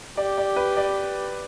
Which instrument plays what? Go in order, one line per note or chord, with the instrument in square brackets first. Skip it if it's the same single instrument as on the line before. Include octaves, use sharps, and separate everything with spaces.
[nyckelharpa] G4 [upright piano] D5
[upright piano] D5
B4
D5